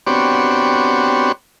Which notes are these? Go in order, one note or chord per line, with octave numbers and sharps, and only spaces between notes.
B3 C4 D4 F#4 G4 C#5